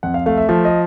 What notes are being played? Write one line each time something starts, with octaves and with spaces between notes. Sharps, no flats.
F2 F#5
F5
A3 F5
E5
F3 E5
D#5